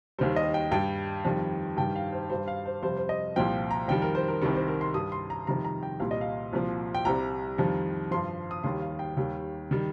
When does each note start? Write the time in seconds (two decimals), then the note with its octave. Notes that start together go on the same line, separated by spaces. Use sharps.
0.18 D#2 D#3 G3 C5
0.36 D#5
0.54 G5
0.72 G2 G3 G5
1.25 F2 D#3 G3
1.77 G2 D#3 G3 G5
1.96 F5
2.12 C5
2.30 G2 G3 C5
2.48 F5
2.65 C5
2.83 F2 C3 G3 C5
2.97 C5
3.09 D#5
3.36 C2 A#2 F3 G5
3.71 A#5
3.88 F2 D#3 G3 G5
4.02 A#4
4.15 C5
4.28 A#4
4.42 C2 C3 D#3 G3
4.55 C5
4.68 A#4
4.81 C6
4.94 G2 G3 D#6
5.12 C6
5.30 A#5
5.47 F2 C3 D#3 G3 A#5
5.65 A#5
5.83 G5
6.00 C2 A#2 G3 F5
6.11 D#5
6.21 F5
6.53 C2 A#2 F3
6.95 G5
7.05 C2 C3 G3 A#5
7.58 F2 D#3 G3
8.11 G2 F3 C6
8.51 D#6
8.63 D#2 D#3 G3 C6
8.82 F5
8.99 G5
9.17 D#2 D#3 G3
9.71 D#3 G3